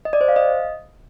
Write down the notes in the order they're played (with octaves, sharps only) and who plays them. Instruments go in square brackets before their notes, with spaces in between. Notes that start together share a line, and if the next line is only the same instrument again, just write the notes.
[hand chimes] D#5
D5
C5
F5
D#5